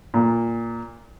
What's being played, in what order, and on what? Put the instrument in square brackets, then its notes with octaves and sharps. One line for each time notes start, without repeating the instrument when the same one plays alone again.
[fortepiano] A#2